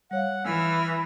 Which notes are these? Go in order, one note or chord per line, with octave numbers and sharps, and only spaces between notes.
G3 C#5 F5 F#5
E3 G#5 E6 F6